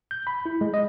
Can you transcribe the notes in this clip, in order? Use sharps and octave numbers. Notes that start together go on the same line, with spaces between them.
G6
B5
E4
G#3
D#5